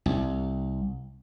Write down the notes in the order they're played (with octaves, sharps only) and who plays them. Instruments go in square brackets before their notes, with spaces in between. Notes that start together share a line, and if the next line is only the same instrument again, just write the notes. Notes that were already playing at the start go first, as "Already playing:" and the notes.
[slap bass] C2